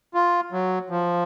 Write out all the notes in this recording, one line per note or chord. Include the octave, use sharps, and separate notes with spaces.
F4
F#3
F3